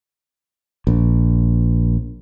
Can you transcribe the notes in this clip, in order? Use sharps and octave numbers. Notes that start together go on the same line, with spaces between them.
A#1